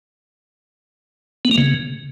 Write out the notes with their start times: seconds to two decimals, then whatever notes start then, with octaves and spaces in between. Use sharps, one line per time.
1.45 B3
1.51 A#3
1.58 C#3